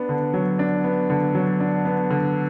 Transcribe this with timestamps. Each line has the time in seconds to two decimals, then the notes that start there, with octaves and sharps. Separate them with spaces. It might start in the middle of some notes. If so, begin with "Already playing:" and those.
Already playing: B3 D4
0.09 D3
0.34 F#3
0.59 D4
0.84 B3
1.10 D3
1.35 F#3
1.60 D4
1.85 B3
2.10 D3